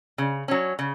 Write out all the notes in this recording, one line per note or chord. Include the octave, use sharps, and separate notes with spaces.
C#3
F#3 C#4
C#3